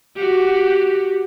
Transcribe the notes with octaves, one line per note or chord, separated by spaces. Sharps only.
F#4 G4